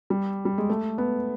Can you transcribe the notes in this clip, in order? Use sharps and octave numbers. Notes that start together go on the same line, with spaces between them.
G3
G3
G#3
A3
B3